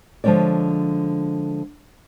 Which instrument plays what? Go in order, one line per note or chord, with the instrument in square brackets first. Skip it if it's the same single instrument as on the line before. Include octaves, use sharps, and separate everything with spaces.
[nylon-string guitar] D3 F3 G#3 C4 C#5 D5